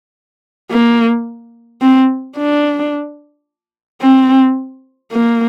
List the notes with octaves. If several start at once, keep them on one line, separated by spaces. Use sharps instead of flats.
A#3
C4
D4
C4
A#3